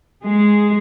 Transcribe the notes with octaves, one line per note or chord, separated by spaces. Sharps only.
G#3 G#4